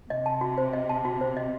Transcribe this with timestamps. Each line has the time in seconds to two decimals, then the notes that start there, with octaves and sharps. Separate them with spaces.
0.10 C3 D#5
0.26 A5
0.41 F#4
0.58 C5
0.73 D#5
0.89 A5
1.05 F#4
1.21 C5
1.37 D#5